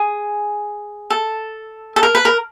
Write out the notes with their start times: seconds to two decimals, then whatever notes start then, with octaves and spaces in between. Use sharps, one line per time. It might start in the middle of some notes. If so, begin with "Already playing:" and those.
Already playing: G#4
1.10 A4
1.96 A4
2.03 A#4
2.15 B4
2.25 A#4